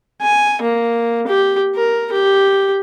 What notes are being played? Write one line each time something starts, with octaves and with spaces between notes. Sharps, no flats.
G#5
A#3
G4
A#4
G4